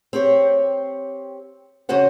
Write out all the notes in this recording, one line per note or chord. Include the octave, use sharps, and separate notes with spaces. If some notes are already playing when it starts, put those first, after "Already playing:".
C4 G4 C#5
F2 C#3 C#4 F#4 C5 F#5